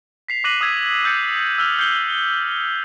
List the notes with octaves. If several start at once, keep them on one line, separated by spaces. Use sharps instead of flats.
B6 C7 F7
D6 F#6 A#6 B6 D#7 F#7
D#6 E6 G#6 B6 D#7
E6 G6 A6 C#7 D#7
E6 F6 F7
F6 G6 C7 C#7 G7